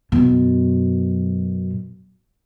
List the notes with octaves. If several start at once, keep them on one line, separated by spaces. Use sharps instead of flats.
F#2 B2